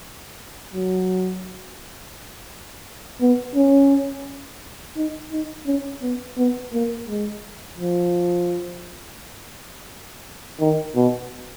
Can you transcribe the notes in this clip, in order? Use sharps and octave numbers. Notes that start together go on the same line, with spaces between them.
F#3
B3
C#4
D#4
D#4
C#4
B3
B3
A#3
G#3
F3
D#3
B2